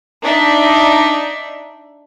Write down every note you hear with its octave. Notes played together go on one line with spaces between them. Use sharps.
D4 D#4 E5